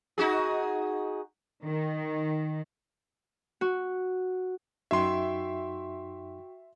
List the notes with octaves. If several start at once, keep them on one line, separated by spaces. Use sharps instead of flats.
D#4 F#4 G#4
D#3
F#4
F#2 D#4 F#4 E5 G5 C6